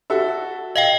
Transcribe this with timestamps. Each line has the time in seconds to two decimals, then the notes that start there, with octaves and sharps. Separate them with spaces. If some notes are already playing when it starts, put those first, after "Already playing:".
0.10 F#4 A4 E5
0.76 D#5 F5 G5 G7